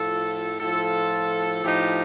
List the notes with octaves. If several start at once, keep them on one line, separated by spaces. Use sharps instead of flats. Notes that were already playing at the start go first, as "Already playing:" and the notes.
Already playing: A2 F3 F4 A4
A2 F3 F4 A4
A2 F3 D#4 G4